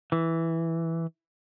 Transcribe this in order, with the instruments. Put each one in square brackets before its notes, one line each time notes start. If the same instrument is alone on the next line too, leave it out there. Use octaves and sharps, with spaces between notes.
[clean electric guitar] E3